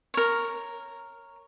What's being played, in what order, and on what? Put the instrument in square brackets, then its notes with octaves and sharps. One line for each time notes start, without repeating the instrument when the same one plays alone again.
[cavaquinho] A#4 C#5